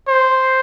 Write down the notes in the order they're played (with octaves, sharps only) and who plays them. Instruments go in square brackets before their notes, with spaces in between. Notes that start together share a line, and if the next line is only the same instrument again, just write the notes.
[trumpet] C5